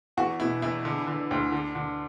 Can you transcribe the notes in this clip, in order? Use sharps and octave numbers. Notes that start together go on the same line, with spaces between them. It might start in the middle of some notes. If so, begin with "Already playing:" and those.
E2 F#4
B2 E4
E2 E4
D3
D3
D2
D3
D3